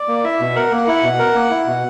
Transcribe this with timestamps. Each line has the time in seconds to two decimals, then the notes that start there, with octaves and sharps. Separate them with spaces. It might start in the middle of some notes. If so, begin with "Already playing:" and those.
Already playing: D5
0.08 A#3
0.24 E4 E5
0.40 B2
0.56 A#4 F#5
0.71 A#3
0.87 E4 F#5
1.03 B2
1.19 A#4
1.35 A#3
1.50 E4
1.66 B2